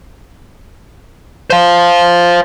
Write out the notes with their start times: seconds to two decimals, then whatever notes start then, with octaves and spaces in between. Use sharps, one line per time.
1.50 C5 F5